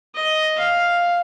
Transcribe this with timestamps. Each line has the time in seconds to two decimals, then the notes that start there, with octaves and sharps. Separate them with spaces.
0.15 D#5
0.57 F5